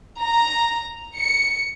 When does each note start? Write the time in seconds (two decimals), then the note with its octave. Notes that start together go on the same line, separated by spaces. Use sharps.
0.20 A#5
1.17 C#7